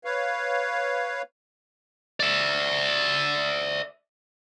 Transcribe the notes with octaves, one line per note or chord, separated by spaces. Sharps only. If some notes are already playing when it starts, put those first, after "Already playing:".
B4 C#5 F5
D5 E5